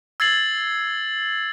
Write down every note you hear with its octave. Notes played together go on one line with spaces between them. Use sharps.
E6 G#6 A6 C7 F#7